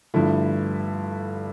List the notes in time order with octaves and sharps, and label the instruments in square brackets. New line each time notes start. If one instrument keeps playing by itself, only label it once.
[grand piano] G2 D3 F3 A3 E4